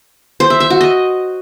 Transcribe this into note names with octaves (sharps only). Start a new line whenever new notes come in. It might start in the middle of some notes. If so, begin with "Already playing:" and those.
C5
E5
E5
F#4
D#5